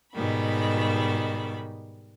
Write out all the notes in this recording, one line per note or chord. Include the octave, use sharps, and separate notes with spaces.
G#2 B2 D#3 G3 B5